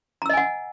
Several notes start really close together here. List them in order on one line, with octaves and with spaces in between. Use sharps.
A#5 E6 D#5 G#5 F#5